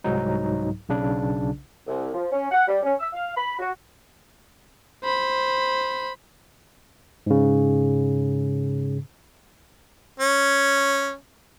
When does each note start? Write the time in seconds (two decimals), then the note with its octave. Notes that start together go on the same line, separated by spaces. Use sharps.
0.04 C2 G#2 F#3 D#4
0.89 B1 C#3 D4
1.87 C2
2.14 F3
2.32 C#4
2.51 F#5
2.67 G3
2.83 C#4
2.99 E6
3.13 F5
3.35 B5
3.59 F#4
5.04 C5 B5
7.26 G#2 C#3
10.20 C#4